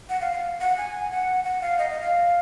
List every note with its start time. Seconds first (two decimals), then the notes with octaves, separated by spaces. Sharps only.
0.09 F#5
0.21 F5
0.32 F5
0.60 F#5
0.77 G#5
1.11 F#5
1.44 F#5
1.62 F5
1.79 D#5
1.90 D#5
2.01 F5